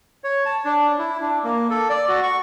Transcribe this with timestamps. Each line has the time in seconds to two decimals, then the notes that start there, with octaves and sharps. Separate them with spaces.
0.24 C#5
0.46 A5
0.65 D4
0.99 E4
1.22 D4
1.44 A#3
1.70 A4
1.90 D5
2.09 F#4
2.23 C#6